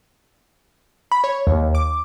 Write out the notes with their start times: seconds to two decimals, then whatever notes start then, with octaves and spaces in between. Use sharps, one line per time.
1.12 B5
1.24 C#5
1.47 D#2
1.75 D6